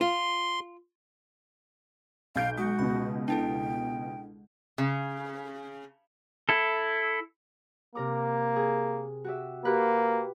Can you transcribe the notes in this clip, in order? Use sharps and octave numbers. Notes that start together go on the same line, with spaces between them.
F4 C6
B1 F5 G6 D7
G#3 F#4 D#6
C#2 B2 B5
D4 E4 A4 G5 A5
C#3
E4 A4
C3 A#3 A#4 D6
G#4
F#4 G4 E5
A#3 F#4 G4 B4